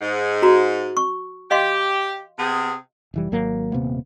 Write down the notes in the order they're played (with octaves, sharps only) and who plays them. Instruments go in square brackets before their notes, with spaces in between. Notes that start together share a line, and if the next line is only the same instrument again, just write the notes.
[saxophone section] G#2
[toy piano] F#4 A#5
C#6
[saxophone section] G4 [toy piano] D#5 F5 C6
[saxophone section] C3 B3 G#4
[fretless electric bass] F1 E3 G3
G#1 F#3 A#3
D#1 C3 A#3 B3